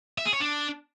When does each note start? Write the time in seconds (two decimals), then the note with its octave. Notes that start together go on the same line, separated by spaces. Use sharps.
0.18 E5
0.26 G#4
0.33 C#5
0.41 D4